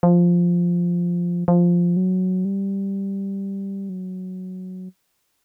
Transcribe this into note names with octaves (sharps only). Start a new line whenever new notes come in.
F3
F3
F#3
G3
F#3